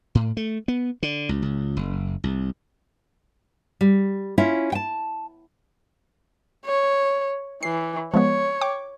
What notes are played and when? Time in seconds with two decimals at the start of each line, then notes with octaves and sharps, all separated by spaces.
0.15 A2
0.37 A3
0.68 B3
1.03 D3
1.29 C#2
1.42 C#2
1.77 F#1
2.24 C2
3.81 G3
4.38 C#4 E4 F4 C#5
4.72 G5 A5
6.65 C#5
7.63 E3 C7
8.14 F3 G#3 B3 C#5
8.61 G5 D6